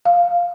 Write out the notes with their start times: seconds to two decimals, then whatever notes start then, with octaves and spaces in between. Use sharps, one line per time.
0.05 F5